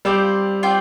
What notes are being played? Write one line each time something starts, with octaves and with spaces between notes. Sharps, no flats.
G3 C4 F4 D5 G5
C4 F4 D5 G5